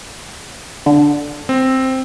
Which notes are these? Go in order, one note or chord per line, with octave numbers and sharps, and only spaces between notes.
D3
C4